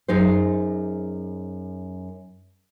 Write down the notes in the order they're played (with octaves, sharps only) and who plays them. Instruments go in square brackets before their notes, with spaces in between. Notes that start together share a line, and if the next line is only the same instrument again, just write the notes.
[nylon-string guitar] F#2 D#4 G#4 C5